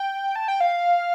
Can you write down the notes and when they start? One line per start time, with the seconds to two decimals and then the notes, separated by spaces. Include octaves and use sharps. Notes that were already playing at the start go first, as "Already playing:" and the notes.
Already playing: G5
0.36 A5
0.48 G5
0.61 F5